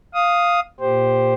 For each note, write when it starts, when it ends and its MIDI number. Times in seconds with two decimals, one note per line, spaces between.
0.14 0.60 77
0.14 0.60 87
0.80 1.34 46
0.80 1.34 67
0.80 1.34 72